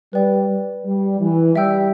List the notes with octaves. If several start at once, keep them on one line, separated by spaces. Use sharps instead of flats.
G3 B4 D5 G5
G3
E3
G3 E5 G5 E6 G6